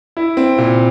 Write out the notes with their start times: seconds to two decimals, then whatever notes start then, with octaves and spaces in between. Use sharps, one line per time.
0.17 E4
0.37 C4
0.58 A#2